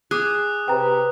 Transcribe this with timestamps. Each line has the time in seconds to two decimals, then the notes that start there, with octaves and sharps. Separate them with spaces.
0.11 G#4 D6 D#6 F#6
0.68 C3 B4 G5 A#5